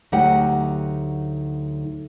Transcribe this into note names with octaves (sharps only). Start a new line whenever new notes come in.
D2 F#3 D#4 G4 F#5 G5